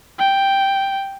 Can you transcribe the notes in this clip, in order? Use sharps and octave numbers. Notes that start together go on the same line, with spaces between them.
G5